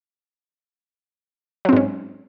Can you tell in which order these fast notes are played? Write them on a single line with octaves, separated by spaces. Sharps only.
F#3 C4 G#2 C#4